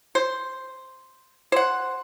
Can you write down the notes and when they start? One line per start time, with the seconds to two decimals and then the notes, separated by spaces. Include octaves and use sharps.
0.15 C5
1.52 C5 F#5